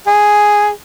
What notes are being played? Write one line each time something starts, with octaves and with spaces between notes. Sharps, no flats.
G#4